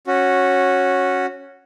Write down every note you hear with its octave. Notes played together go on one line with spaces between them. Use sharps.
C#4 F#4